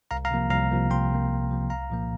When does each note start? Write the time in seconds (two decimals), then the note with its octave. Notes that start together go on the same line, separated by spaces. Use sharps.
0.11 C2 F5 A#5
0.25 F5 A#5
0.31 C3 F3 A#3
0.50 C2 F5 A#5
0.71 C3 F3 A#3
0.90 C2 G5 C6
1.10 C3 F3 A#3
1.30 C2
1.50 C3 F3 A#3
1.70 C2 F5 A#5
1.90 A#2 F3 A#3